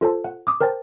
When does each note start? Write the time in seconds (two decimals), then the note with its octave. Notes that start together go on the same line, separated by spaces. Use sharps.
0.01 F4 A4 C5 A5
0.24 F#5
0.47 D6 D#6
0.61 A#4 C5 G5 A5 A6